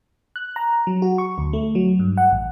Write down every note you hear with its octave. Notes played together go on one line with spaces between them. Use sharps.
F#6
A#5
F#3
F#4
C#6
D2
A3
F#3
G2
F#5
A1